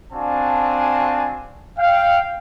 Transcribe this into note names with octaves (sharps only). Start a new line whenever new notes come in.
C4 D4 F#4 F5 G#5 A5
F5 G5